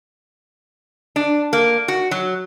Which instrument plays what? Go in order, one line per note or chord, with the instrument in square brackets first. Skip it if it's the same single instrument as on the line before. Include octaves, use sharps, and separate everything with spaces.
[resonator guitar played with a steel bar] D4
A#3
F#4
F#3